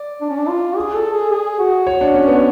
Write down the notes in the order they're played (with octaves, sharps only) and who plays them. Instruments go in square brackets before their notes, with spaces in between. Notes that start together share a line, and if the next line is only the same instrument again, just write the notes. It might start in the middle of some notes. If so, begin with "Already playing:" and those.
Already playing: [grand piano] D5
[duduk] D4
C#4
D4
F4
G#4
A4
G#4
G#4
F#4
[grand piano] C#5
D4
C#4
B3